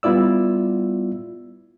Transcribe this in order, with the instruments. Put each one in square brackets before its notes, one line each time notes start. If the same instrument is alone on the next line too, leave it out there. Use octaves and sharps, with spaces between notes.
[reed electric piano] G3 B3 E4 F4 D5 E6